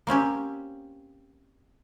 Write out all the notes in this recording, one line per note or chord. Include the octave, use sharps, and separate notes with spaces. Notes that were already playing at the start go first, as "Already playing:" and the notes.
A#3 C4 C#4 G4